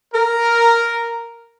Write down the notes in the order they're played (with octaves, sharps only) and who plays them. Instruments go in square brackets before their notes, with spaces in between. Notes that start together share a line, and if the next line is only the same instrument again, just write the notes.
[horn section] A#4